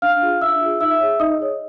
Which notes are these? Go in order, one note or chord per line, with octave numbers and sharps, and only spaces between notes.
D4 F5 F6
F4 G#4
D4 E5 E6
F4 G#4
D#4 E5 E6
G#4 C#5
D#4 D#5 D#6
G#4 C#5